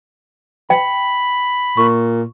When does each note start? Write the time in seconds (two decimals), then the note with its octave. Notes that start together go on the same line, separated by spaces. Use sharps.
0.70 G5 B5
1.77 A#2 C#6